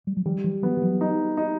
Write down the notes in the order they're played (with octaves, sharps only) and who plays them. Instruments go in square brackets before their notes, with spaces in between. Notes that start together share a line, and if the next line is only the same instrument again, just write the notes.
[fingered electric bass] G3
F#3
[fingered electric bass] D#3 F3 [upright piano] G3
[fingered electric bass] E3 F#3
[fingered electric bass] E3 F#3 [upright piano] B3
[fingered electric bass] F3
E3 F#3
[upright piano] D#4
D#4